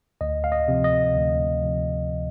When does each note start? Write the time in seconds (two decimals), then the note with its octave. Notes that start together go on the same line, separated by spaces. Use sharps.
0.21 D2 D#5
0.44 F5
0.52 D#5
0.68 C3 F3
0.84 D#5
1.15 D2
1.62 C3 F3